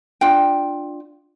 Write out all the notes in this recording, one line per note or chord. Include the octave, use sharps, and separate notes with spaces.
D4 F4 G5